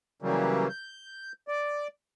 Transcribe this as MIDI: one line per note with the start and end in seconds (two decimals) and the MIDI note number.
0.22 0.68 49
0.22 0.68 52
0.22 0.68 54
0.22 0.68 55
0.22 0.68 58
0.69 1.32 91
1.48 1.87 74